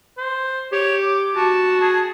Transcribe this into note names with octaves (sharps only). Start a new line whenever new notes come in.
C5
G4 C#5
D6
F#4 A5
G#4